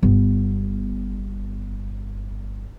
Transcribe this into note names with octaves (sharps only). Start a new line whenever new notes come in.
G1 B3